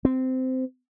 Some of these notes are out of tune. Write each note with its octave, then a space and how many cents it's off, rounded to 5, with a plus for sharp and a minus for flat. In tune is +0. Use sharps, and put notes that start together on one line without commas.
C4 -15